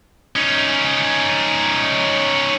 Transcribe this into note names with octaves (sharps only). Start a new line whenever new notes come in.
C#4 D#4